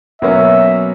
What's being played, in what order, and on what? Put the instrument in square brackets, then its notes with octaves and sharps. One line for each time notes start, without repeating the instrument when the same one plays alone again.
[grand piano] B2 F#3 A#3 C#4 [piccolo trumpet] E5